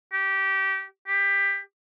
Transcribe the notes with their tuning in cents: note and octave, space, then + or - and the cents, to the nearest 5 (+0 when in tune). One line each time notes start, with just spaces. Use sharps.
G4 -20
G4 +20